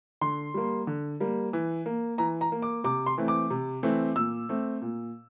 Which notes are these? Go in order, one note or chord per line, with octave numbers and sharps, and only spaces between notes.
D3 C6
G3 A#3
D3
G3 A#3
E3
A#3
E3 A#5
A#5
A#3
D6
C3 D6
C6
E3 A3 C4
D6
C3
E3 A3 C4
A#2 E6
A3 C4
A#2